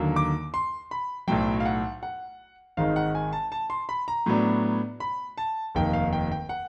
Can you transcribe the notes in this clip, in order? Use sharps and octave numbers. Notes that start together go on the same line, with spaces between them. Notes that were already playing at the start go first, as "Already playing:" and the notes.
Already playing: D#2 D3 F#3 A#3
D6
C6
B5
B1 A2 F#3 G5
F5
F#5
F#5
G#1 G#2 D#3 F5
F#5
G#5
A5
A5
C6
B5
A#5
A2 F#3 B3 D4
B5
A5
F1 D#2 D#3 G5
F5
G5
G5
F#5